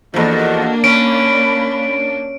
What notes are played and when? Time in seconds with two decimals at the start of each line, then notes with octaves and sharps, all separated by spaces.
0.14 E2 F3 A#3 D4 F#4 A4 D#5
0.84 C#4 B5 D7